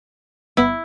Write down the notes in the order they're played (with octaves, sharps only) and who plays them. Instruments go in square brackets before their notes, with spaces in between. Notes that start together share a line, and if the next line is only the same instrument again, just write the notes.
[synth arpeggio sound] G1 B3 B5 [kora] E4